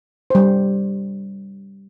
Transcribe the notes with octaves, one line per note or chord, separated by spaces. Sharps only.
G3 C5